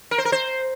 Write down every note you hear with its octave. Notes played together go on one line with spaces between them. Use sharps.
A#4
C5
A#4
C5